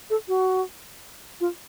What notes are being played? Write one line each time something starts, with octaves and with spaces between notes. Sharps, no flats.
A4
F#4
F4